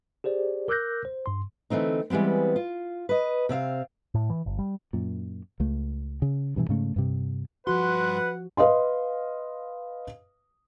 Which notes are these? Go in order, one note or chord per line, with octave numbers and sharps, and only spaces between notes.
G4 G#4 C5 D5
A#4 D6 E6 F#6 G6 A#6
C5
G2 C6
D3 E3 A3 C4 D#4
E3 G3 G#3 B3 C4
F4
B4 D#5
C3 C4 E5 F5
A2
E3
G1
G3
F#2 A#2
C#2 A3
C#3
G2 B2 E3
G#2 C#3 A3
G2 C3
G2 F3 F#4 B4 F#5 C6
B4 D#5 F5 C6